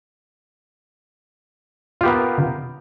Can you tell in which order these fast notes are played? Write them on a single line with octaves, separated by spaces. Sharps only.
F4 G4 B3 A#4